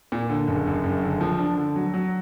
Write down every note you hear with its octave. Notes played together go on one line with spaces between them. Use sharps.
A#2
D3
F#1
F#2
F#1
D3
F3
D4
D3
F#3
F#3